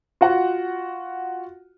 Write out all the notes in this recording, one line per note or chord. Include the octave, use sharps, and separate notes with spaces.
F4 F#4 F#5